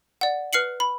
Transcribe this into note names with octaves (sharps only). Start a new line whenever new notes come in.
D5 F#5
B4 F6 C7 C#7 F#7
B5